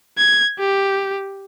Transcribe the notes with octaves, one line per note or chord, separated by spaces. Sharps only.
G#6
G4